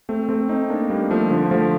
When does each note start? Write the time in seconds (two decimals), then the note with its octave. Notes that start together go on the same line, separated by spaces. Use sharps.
0.09 A3 C4
0.29 A3 C4
0.49 C4 D#4
0.70 A#3 D4
0.90 G3 A#3
1.10 F3 A3
1.31 D3 F3
1.51 F3 A3